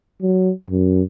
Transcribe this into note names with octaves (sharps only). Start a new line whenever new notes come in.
F#3
F#2